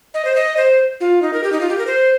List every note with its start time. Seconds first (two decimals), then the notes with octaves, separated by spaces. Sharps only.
0.14 D#5
0.25 C5
0.36 D#5
0.57 C5
1.00 F4
1.22 D#4
1.33 A#4
1.44 G4
1.52 D#4
1.61 F4
1.69 G4
1.78 A#4
1.87 C5